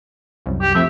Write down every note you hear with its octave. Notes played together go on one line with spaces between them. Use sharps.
C2 F#2
G4
F3 A3 C4 E5